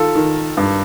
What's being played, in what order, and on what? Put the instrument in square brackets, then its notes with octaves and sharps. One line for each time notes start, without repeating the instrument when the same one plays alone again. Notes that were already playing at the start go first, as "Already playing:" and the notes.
Already playing: [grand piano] D#3 F4 A4
D#3
G2